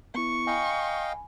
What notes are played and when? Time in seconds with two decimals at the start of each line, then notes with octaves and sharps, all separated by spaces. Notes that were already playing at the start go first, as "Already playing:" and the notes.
0.15 B3 E4 C#6
0.47 D#5 F5 G5 G#5 B5